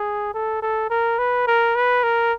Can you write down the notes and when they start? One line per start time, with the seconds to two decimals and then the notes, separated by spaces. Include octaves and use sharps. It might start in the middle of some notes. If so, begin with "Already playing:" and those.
Already playing: G#4
0.34 A4
0.62 A4
0.90 A#4
1.19 B4
1.47 A#4
1.76 B4
2.03 A#4